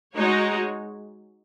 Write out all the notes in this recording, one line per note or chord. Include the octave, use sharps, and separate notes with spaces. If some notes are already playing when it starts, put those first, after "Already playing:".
G#3 D#4 F#4 C#5